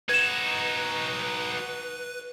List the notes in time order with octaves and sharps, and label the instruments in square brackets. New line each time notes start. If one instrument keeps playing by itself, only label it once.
[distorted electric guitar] D#4 F#4 [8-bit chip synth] B4 [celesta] G#6 E7